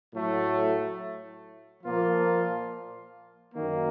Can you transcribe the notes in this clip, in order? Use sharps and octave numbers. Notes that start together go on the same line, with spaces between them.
A2 F#3 A3
A#2 F3 A#3 F4
F#2 D#3 A#3